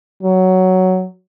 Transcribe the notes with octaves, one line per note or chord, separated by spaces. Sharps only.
F#3